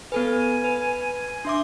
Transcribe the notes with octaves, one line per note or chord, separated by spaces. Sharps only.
B3 A4 B4 G#5
B4
D4 E5 C6 D6